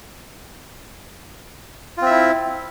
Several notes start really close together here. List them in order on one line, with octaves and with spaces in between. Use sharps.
F4 C4 E5 E4